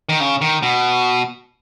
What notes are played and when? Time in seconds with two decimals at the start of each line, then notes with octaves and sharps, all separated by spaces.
0.09 D#3
0.20 C#3
0.41 D#3
0.62 B2